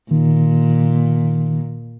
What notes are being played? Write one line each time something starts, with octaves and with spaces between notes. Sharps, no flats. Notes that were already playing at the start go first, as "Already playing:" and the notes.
A#2 D#3